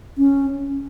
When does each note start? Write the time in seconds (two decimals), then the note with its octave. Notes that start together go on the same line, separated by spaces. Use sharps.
0.18 C#4